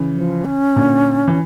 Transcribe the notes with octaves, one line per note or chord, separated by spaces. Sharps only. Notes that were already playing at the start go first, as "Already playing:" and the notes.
Already playing: C#3 E3
F3
C#4
A#2 D3
E3